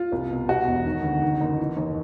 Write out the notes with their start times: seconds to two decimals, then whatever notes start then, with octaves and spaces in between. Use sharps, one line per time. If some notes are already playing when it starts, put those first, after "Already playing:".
Already playing: F4
0.12 C2
0.31 B2
0.48 B2 F#4
0.67 E1
0.86 D#3
1.04 D2
1.22 D#3
1.41 F#1
1.58 E3
1.77 D#2